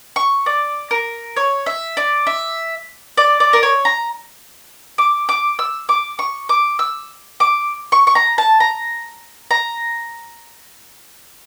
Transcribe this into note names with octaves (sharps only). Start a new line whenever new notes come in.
C#6
D5
A#4
C#5
E5
D5
E5
D5
D5
A#4
C#5
A#5
D6
D6
E6
D6
C#6
D6
E6
D6
C#6
C#6
A#5
A5
A#5
A#5